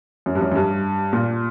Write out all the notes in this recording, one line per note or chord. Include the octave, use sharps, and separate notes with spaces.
F#2
G2
F#2
F#2
G2
A#2